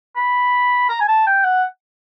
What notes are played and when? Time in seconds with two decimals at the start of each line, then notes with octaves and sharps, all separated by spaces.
0.16 B5
0.89 A#5
1.01 G#5
1.08 A5
1.27 G5
1.44 F#5